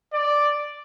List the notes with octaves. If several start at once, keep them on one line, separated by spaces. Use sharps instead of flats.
D5